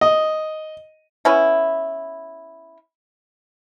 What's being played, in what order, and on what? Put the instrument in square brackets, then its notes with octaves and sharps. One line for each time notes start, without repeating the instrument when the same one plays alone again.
[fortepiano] D#5
[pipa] B3 C#4 E4